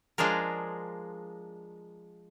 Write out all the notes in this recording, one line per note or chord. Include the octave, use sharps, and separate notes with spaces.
F3 G#3 D4 G#4 A#4